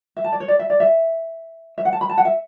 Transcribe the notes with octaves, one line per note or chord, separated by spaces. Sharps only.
E5
A5
D5
C#5
D5
E5
D5
E5
E5
F#5
A5
B5
A5
F#5
E5